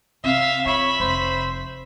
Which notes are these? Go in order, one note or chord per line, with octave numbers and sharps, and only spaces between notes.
C3 C4 E5 F5
F4 C#5 E5 B5
F1 C5